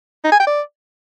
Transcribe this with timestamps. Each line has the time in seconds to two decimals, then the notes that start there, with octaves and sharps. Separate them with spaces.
0.24 D#4
0.32 G#5
0.40 G5
0.47 D5